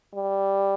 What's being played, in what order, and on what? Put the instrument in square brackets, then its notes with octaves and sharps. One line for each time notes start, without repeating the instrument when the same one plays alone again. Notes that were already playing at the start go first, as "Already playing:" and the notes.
[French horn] G3